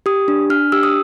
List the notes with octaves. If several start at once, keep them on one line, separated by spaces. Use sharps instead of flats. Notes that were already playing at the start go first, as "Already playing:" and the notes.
G4 D#6
D4
D4 F6
G4 E6
D#6